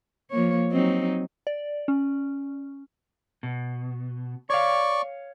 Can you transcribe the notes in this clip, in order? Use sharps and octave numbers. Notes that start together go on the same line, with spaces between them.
F3 A#3 C#5
F#3 C4 D#4
D5
C#4
B2
C#5 D5 F5 C#6